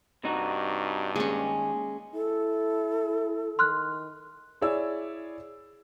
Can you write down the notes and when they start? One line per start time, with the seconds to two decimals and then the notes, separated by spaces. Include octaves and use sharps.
0.24 G2 C3 D#4 F#4
1.16 D#2 G#3 C#4
2.14 E4 A4
3.59 D#3 C6 F6 F#6
4.61 E4 G#4 C#5 D5 E6